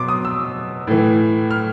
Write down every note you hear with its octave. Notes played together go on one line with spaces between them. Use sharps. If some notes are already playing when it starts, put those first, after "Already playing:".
Already playing: B2 F#3 C6 D6
D#6
E6
A2 E3
F6